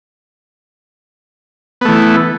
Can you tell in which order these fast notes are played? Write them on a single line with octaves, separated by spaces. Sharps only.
B3 A3 E3